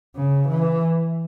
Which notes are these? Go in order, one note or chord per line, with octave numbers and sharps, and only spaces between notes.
C#3
E3